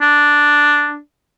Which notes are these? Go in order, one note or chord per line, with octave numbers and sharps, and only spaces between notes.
D4